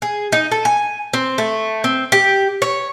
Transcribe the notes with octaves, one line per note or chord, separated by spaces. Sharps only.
G#4
D#4
A4
G#5
C4
A3
C4
G4
C#5